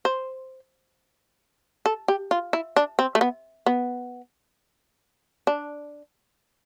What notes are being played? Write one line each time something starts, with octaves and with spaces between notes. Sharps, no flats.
C5
A4
G4
F4
E4
D4
C4
A3
B3
B3
D4